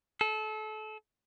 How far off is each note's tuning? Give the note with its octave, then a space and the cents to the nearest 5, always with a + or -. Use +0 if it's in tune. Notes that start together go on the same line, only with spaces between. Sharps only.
A4 -30